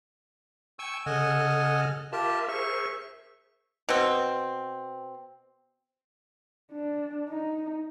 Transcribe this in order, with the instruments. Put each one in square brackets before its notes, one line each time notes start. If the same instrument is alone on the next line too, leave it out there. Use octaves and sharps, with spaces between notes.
[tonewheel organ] G5 G#5 [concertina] C#6 E6
[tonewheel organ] C#3 A4 F6 [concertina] D#5 F#5 G#5
[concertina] F4 G4 A5 [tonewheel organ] A#4 E5
[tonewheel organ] G#4 A#4 C5 [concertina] E5 C#6
[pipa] B2 C4
[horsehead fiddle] D4
D#4